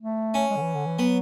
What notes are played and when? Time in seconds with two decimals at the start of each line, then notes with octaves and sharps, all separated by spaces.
0.02 A3
0.34 C#4
0.51 G#3
0.57 D3
0.62 E3
0.75 D3
0.86 E3
0.99 F#3 B3